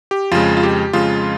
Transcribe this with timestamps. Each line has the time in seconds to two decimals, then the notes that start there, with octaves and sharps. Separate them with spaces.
0.11 G4
0.32 F2 C#3 G#3 F4
0.57 F4
0.63 G4
0.93 F2 C#3 G#3 F4